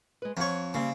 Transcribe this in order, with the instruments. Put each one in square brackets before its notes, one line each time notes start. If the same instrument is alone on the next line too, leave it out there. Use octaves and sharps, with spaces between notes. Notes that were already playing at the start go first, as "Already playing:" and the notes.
[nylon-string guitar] G#3 B4
[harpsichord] F2 C#5 [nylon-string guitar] F3 F#5
[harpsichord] C#3 [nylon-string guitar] G3 A#3 C4